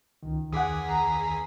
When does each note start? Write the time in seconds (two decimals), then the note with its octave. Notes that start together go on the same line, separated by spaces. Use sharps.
0.23 C#2 D#3
0.52 E2 G#4 F#5 D6 D#6 B6
0.88 A#5